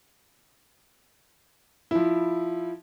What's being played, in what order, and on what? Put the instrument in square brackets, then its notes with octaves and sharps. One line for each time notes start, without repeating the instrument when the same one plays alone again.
[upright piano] F3 E4